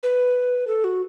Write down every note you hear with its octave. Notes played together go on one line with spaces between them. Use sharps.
B4
A4
F#4